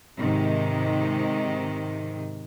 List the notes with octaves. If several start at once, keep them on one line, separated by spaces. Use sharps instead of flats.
G#2 C3 D#3